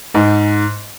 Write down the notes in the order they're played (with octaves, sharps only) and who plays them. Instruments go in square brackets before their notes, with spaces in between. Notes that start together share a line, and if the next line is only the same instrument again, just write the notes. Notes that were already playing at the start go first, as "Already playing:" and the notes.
[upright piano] G#2